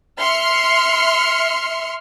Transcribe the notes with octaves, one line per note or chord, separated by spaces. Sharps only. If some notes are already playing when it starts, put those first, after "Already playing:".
E5 C6 F6 C#7